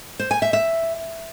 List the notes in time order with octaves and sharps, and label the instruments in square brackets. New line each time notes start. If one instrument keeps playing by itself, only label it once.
[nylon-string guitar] C5
G#5
E5
E5